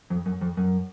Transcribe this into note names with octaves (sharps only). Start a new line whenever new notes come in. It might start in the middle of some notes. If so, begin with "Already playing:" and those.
F2
F#2
F2
F#2